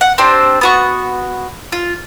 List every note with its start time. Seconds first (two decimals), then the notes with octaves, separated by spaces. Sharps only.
0.01 F#5
0.18 C4 D4 G4 C5
0.61 B3 F#4 C#6
1.72 F4